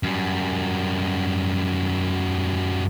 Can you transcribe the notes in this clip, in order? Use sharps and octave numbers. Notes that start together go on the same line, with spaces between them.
F#2 G3